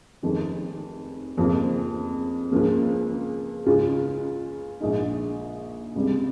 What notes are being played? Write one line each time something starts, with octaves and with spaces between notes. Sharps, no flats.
F1 F2 D#3 G#3 C#4
F1 F2 C#3 F3 A#3
C#2 C#3 F3 A#3
C#2 C#3 G#3 C#4 F4
A#1 A#2 G#3 D#4
C#2 C3 G3